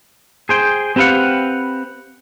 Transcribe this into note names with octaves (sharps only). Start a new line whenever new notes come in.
G#4 C5 G5
C4 G4 B4 F5 F#5